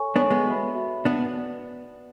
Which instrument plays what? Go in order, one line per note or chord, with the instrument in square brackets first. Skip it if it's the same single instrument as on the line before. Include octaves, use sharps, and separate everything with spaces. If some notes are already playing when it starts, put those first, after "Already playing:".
Already playing: [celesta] A4 C#5 G#5 C#6
[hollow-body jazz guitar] B3 D4 [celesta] A4 C#5 G#5 C#6
[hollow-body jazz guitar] G#3 B3
[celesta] F#4 B4 E5 B5
F#4 B4 E5 B5
[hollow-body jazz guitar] B3 D4 [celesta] B4 D5 F#5
[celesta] B4 D5 F#5